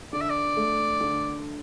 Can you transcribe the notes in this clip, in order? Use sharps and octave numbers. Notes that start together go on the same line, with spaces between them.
D3 D5
E5
D5
A3
D3